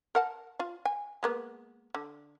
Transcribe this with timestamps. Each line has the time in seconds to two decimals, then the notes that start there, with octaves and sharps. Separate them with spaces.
0.15 A#4 F#5 A5
0.59 F4 F5
0.85 G#5
1.23 G#3 A#3 B3
1.95 D3